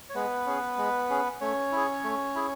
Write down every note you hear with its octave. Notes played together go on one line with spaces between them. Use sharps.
C#5
G#3 B3 B4
C#4 G#4
G#3
C#4 G#4
A3 C#4 C#5
E4 G#4
A3
E4 G#4